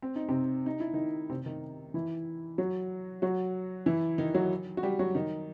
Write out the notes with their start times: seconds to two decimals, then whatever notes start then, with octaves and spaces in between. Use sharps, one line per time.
0.02 C4
0.16 D#4
0.29 C3 C4
0.66 D#4
0.80 E4
0.93 D#3 D#4
1.30 C3 C4
1.46 D#3 D#4
1.94 E3 E4
2.58 F#3 F#4
3.22 F#3 F#4
3.86 E3 E4
4.18 D#3 D#4
4.34 F#3 F#4
4.77 F#4
4.83 G3 G4
4.99 F#3 F#4
5.15 D#3 D#4